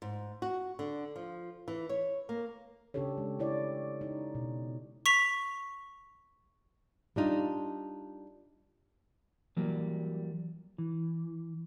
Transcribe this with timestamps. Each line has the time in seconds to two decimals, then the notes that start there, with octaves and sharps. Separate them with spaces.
0.02 G#2
0.42 F#4
0.79 D3
1.16 F3
1.68 E3
1.89 C#5
2.29 A#3
2.94 C#3 C#4 D4 G4 A4 C#5
3.18 G#3
3.39 E4 C#5 D5
4.01 D#4
4.35 B2
5.06 C#6 B6 F7
7.16 G3 D4 D#4 F4
9.57 E3 F#3 G3 A#3
10.78 E3